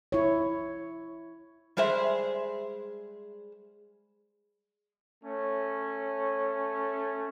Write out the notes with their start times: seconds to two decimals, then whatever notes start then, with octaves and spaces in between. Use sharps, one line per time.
0.12 E4 C#5
1.77 G3 G#3 G#4 C5 E5
5.24 A3 C#4 C#5